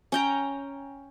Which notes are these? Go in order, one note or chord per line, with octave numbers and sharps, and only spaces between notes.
C#4 G5 A#5